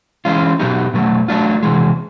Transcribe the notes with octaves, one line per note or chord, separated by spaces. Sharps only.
E3 G#3 C#4 F4
B2 F#3 B3 D#4 G4
B2 F#3 A3
F#3 A3 D4 F4
C3 E3 G#3